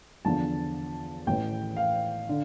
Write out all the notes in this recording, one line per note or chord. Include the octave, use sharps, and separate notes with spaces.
E2 D3 F3 A5
A1 A2 E3 G5
F5
D3